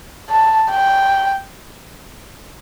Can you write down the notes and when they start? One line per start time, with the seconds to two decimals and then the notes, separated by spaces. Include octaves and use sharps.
0.30 A5
0.71 G5